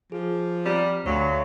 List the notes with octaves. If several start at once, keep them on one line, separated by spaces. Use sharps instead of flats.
F3 G#4
G3 C4 A#5 F6
D2 F#3 C#5 F5 A#5